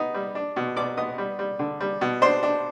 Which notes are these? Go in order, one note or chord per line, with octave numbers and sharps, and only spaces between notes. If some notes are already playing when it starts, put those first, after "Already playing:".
Already playing: B3 D#4
G3
D4
B2
B2 D5 D6
B3 D#5 D#6
G3
G3
D3
G3
B2
D4 C5 C6
D4